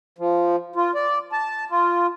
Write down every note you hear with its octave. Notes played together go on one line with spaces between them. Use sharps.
F3
F4
D5
A5
F4